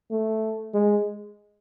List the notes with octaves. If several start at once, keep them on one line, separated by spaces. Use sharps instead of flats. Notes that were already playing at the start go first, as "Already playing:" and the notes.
A3
G#3